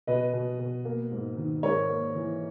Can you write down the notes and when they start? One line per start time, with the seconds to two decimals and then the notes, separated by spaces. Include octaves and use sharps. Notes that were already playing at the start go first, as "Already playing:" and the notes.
0.07 B2 B4 D#5
0.33 B2
0.59 B2
0.85 A#3
1.11 G#2
1.37 D#3
1.63 G#2 A#4 C#5
1.89 A#3
2.15 E3